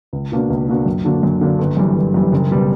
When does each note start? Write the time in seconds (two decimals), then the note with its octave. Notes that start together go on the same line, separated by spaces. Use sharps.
0.13 C#2
0.32 B2 A#3 D4 F#4
0.50 C#2
0.68 B2 A#3 D4 F#4
0.86 F#2
1.05 D3 A#3 D4 F#4
1.23 F#2
1.41 D3 A#3 D4 F#4
1.59 G1
1.77 F#2 E3 G3
1.95 G1
2.14 F#2 E3 G3
2.32 F#1
2.51 B2 G3